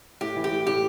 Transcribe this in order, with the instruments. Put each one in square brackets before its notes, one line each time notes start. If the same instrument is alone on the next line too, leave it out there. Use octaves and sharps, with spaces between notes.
[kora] A2 [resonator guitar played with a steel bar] G4
[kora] E3
[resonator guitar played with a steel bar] G4
[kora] A2
[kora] A2 [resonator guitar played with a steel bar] G4